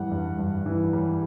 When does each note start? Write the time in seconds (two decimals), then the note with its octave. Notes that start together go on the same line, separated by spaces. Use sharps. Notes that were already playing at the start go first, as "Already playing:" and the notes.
Already playing: G2 E3 G3 F#5
0.11 G2
0.39 G2
0.66 E3
0.93 G3